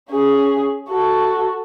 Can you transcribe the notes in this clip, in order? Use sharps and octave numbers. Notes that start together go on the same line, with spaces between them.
C#4 G#4
F#4 A4